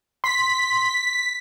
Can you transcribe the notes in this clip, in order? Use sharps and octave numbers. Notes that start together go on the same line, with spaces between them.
C6 B6